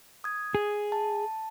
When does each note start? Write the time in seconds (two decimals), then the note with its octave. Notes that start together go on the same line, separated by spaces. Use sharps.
0.24 D#6 G#6
0.55 G#4
0.92 A5